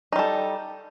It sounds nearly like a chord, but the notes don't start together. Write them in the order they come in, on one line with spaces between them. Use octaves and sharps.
D#4 G3 A4